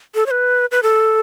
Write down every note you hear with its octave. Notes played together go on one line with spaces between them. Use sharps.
A4
C#5
B4
B4
A4